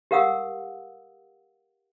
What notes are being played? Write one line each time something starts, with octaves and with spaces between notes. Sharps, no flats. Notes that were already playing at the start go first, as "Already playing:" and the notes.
G4 A#4 F5 F#5 D#6 E6